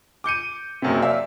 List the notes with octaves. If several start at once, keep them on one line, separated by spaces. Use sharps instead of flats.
D6 G6 C#7 D#7
F#1 F#2 C3
D5 E5 F5